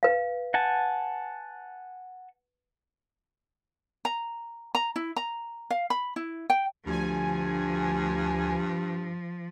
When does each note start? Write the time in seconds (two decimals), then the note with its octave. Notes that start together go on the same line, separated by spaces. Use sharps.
0.03 B4 F5
0.54 F#5 G#5 A5
4.05 A#5
4.75 A#5
4.96 E4
5.16 A#5
5.70 F5
5.90 B5
6.16 E4
6.50 G5
6.86 D2 G2 F3 G#5